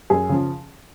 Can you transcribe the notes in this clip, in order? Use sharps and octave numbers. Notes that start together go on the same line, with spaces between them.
F#2 G#4
C#3 F3